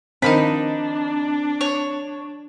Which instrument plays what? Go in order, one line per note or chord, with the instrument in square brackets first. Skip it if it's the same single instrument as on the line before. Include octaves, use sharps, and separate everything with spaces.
[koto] D#3 F3 B4 [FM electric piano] C4 [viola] D4 [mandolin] D#4 B5
[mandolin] C#5